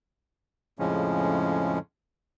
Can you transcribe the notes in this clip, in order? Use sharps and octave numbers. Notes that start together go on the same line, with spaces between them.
F2 A2 C#3 F3 G#3 C#4